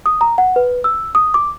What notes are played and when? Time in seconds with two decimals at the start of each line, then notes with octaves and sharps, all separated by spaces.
0.06 D#6
0.21 A#5
0.38 F#5
0.56 B4
0.84 E6
1.15 D#6
1.34 D6